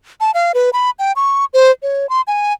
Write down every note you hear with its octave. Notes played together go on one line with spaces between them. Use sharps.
A5
F5
B4
B5
G5
C#6
C5
C#5
C6
G#5